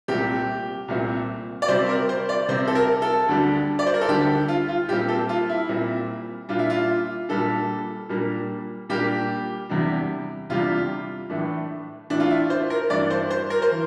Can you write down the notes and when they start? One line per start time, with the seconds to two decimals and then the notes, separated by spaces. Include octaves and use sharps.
0.08 C2 A#2 A3 C4 G4
0.88 C2 A#2 A3 C4
1.62 D5
1.68 C3 G3 C4 C5
1.89 A#4
2.09 C5
2.29 D5
2.48 C3 G3 C4 C5
2.68 A4
2.75 A#4
3.02 A4
3.28 D2 D3 G3 D4
3.79 D5
3.87 C5
3.94 A#4
4.01 A4
4.08 D2 D3 G3 D4 G4
4.48 F4
4.69 F4
4.88 A#2 G3 C4 G4
5.09 A4
5.29 F4
5.49 E4
5.69 A#2 G3 C4
6.49 A#2 G3 D4 F4
6.59 E4
6.70 F4
7.29 A#2 G3 D4 A4
8.09 A#2 G3 A#3 D4
8.89 A#2 G3 A#3 D4 G4
9.69 E2 C3 G3 D4
10.49 E2 C3 G3 D4 F4
11.30 A2 E3 A3 D4
12.10 A2 E3 A3 D4
12.20 F4
12.30 E4
12.50 C5
12.70 A#4
12.90 G2 E3 A3 D4 D5
13.10 C5
13.30 C5
13.50 A#4
13.62 C5
13.71 E3